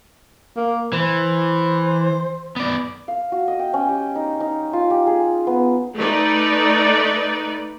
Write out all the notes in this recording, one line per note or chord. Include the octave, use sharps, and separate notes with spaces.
A#3
E3 C5
B3 D5
F5
F#4
D#5
G5
C#4
G4
D#4
D#4
F4
G4
G#4
B3
A3 D#4 B4 D5